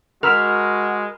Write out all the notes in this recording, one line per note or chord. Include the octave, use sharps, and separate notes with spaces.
G#3 F#4 A#4 B5 E6 F6